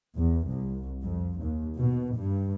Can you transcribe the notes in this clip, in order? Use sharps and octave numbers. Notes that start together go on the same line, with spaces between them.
E2
C2
F2
D#2
B2
G2